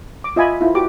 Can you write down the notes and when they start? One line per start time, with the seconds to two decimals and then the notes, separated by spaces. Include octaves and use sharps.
0.24 D6
0.36 F4 D#5 E5 G#5 B5
0.61 E4 F4
0.75 F#4 G4 D6